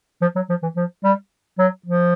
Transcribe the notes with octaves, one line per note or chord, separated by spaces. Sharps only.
F3
F#3
F3
E3
F3
G3
F#3
F3